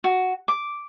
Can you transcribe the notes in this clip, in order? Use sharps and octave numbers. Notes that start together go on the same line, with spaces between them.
F#4
D6